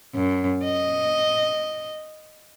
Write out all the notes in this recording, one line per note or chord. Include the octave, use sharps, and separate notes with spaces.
F#2
D#5